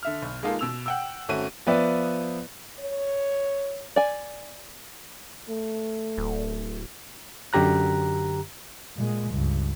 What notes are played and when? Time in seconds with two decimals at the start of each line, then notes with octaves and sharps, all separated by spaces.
0.03 D3 E5 F6
0.22 B1
0.43 G#3 A#3 D#4 F4 A4
0.59 B2 E6 F7
0.86 F#5 G5 E6
1.28 G#1 A3 C#4 F#4 D#7
1.67 F3 B3 B4 D5 E5
2.80 C#5
3.96 D5 G#5
5.50 A3
6.18 D1
7.53 F#2 D3 G4 A#5 F#6
8.97 A#2 G#3
9.32 C#2 G2